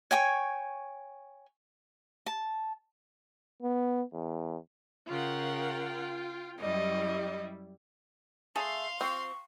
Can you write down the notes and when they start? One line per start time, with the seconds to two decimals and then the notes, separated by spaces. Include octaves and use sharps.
0.11 C#5 G5 G#5 C#6
2.26 A5
3.62 B3
4.13 E2
5.08 C#3 F4 A#4 F#5 G5
6.60 F#2 G3 E4 D#5
8.56 A3 G#4 A4 F5 C6
9.01 C4 F4 C#6